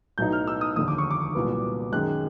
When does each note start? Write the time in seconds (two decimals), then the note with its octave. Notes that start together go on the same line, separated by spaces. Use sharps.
0.18 B1 A2 F#3 B3 D#4 G6
0.32 F6
0.48 E6
0.61 D#6
0.76 F1 D#2 D3 D#6
0.88 D6
0.98 C#6
1.11 D6
1.35 C2 A#2 F#3 B3
1.92 F#2 D#3 G#3 C#4 F#6